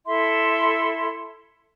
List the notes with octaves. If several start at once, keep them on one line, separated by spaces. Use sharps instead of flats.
E4 A4 E5 C6